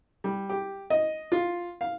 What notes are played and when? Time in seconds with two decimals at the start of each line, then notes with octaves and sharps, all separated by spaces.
0.24 G3
0.49 G4
0.90 D#5
1.32 F4
1.81 F5